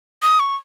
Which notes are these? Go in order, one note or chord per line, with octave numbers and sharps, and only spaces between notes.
D#6
C#6